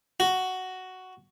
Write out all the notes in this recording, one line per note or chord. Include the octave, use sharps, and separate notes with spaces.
F#4